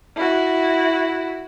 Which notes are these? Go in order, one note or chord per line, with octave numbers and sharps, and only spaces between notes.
E4 F#4